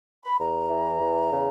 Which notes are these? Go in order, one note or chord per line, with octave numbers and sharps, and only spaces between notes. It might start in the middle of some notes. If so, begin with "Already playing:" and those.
B5
E2 A#5
E3
E2
C#3